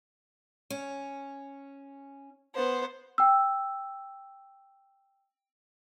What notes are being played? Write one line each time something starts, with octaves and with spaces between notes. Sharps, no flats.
C#4
B3 C5
G5 E6